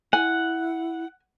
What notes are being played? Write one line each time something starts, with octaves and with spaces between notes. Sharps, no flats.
E4 F#5 G#5